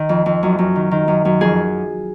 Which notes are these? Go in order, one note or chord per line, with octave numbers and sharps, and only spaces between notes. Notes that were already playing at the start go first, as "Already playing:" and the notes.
Already playing: D#3
F2
F2
F#2
F#2
D#3
D#3
F#2
F#2
F2 G#4